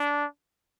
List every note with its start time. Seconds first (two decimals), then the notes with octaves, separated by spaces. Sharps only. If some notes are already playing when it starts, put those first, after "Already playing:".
Already playing: D4